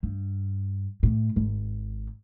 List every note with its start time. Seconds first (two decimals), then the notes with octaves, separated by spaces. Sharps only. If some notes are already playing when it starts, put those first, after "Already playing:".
0.03 G2
1.03 A2
1.36 G#1